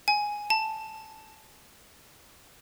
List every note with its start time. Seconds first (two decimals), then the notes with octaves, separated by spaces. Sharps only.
0.08 G#5
0.50 A5